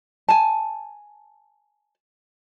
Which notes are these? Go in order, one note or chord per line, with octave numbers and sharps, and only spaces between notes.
G#5 A5